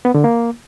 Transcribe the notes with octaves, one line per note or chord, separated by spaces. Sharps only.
B3
D3
A#3